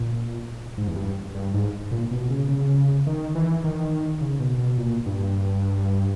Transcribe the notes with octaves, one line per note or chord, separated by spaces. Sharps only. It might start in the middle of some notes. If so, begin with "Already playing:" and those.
Already playing: A#2
G#2
E2
G2
G2
G#2
A#2
B2
C#3
C#3
D#3
E3
D#3
C#3
B2
B2
A#2
G2